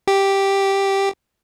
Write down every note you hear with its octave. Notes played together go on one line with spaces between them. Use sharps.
G4